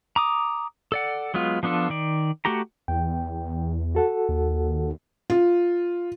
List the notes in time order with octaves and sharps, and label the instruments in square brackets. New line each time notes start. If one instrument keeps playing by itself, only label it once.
[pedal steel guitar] A#5 D6 D#6
A4 D5 F#5
F#3 G#3 B3 F4
F3 B3 D4 F4 A4
D#3 D5
A3 F#4 G4 A#5
[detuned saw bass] E2 [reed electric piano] G5
[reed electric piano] F#4 A4 F#5
[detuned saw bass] D#2
[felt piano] F4